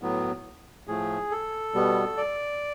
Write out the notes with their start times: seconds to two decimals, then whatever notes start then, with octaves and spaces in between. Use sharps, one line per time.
0.02 A2 F#3 B3
0.87 A2 F3 A3 G#4
1.31 A4
1.75 B2 G3 B3
2.17 D5